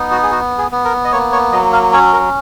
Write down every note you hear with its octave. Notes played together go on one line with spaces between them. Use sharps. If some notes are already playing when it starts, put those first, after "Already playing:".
Already playing: B3 D#4
F#4
G#4
F#4
G#4
B3
A#4
D#5
A#3 C#5
C#5
F#3 D#5
F5
C#4 C#5
A#4